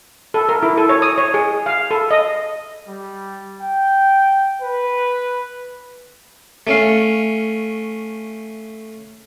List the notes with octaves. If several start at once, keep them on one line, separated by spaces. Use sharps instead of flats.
A4
A#4
E4
A4
C#5
D#6
C#5
G#4
F5
A4
D#5
G3
G5
B4
A3 C#4 F5